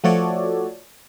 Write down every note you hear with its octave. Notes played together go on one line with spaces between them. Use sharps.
F3 A3 F#4 A4 C#5 D5